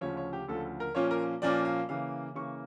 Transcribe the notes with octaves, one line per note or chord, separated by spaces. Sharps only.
D2 C#3 F3 C#5
C#5
G4
D2 C#3 F3 A4
A#4
A#2 F3 A#3 C#4 F4 C#5
A#4
A#2 F3 A#3 C#4 F4 D5
F5
C#3 E3 A#3 F5
C#3 E3 A#3 C#6